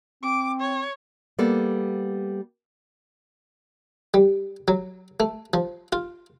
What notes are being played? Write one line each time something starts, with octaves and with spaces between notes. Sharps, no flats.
C4 D6
C#5
G3 A#3 B3 A4
G3
F#3
A3
F3
F4